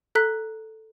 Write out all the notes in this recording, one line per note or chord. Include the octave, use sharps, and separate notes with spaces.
A4 A#5 F#6 B6